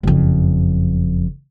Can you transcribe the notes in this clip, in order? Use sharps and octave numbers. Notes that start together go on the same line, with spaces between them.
F#1 F2